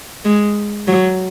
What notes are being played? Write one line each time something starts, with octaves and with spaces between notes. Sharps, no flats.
G#3
F#3